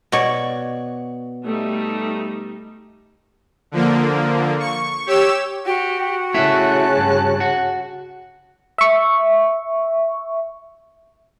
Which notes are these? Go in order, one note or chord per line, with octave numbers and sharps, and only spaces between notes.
B2 F#4 C#5 D5 C#6
G3 A3 D#4
D3 F3 A#3
C#6
G4 C#5 E6 E7
F#4 G4
C#3 A3 E4 A5 F#6
G2
F#4
E5 C#6